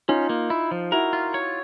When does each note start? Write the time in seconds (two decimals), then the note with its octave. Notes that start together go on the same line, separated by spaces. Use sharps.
0.09 C#4 D#4 F4
0.29 A#3
0.50 E4
0.71 F3
0.92 E4 F#4 A#4
1.13 F4
1.34 C#5